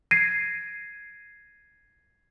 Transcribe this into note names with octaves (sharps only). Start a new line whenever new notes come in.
G#6 A#6 C7 D7 D#7